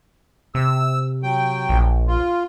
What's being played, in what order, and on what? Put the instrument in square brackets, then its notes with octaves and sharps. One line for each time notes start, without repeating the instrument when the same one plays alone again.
[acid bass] C3 [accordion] E6
[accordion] F#3 G5
[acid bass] A#1
[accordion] F4